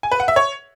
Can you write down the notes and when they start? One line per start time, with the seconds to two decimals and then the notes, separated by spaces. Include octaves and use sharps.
0.03 G#5
0.12 B4
0.20 F#5
0.28 E5
0.36 C#5